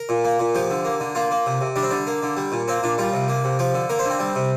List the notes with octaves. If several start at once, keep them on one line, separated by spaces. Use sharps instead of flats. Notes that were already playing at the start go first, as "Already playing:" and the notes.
Already playing: A#4
A#2
A#3
A#2
F3 G4
D3
A#3
D3
A#3 F4
A#3
C3
C3
G3 D4
C4
D3 D4
A#3
D3
G3
A#2
A#3 C4
A#2 D4
G3 F4
C3
A#3
C3
F3 G4
D3
A#3 A#4
C5
D3 C4
G3
C3